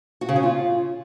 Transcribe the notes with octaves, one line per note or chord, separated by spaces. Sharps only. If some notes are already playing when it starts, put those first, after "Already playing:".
F#4
C#3
C#4
F4